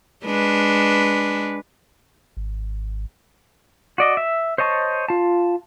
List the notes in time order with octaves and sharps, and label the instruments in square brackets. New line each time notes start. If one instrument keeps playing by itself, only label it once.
[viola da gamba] G#3 D4 B4
[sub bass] G#1
[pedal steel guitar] F#4 D5 D#5
E5
C5 C#5 D#5 A5 C#6
F4 A5